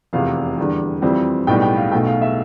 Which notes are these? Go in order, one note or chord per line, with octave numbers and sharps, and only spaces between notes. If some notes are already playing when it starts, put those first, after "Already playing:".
F1 E2 C3 F5
E2 D3 G3
F2 E3 G3 C4
B1 A2 G3 B3 G5
G5
F5
B1 B2 A3 G5
F5
E5